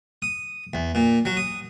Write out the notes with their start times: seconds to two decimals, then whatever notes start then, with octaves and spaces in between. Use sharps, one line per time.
0.22 D#6
0.74 E2
0.95 A#2
1.25 F#3
1.37 D#6